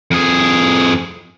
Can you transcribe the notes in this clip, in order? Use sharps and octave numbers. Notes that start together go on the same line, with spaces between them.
F2 G#4